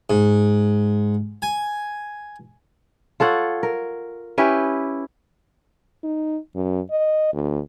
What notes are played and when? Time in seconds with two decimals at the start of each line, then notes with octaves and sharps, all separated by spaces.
0.10 G#2
1.42 G#5
3.20 F4 A4 C#5 F#5
3.63 A#4
4.38 C#4 E4 G4 B4
6.04 D#4
6.56 F#2
6.91 D#5
7.33 D2